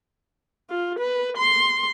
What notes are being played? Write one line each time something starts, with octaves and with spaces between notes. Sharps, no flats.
F4
B4
C6